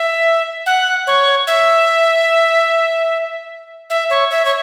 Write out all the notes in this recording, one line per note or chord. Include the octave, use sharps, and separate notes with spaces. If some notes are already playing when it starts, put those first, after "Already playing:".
Already playing: E5
F#5
C#5
E5
E5
C#5
E5
C#5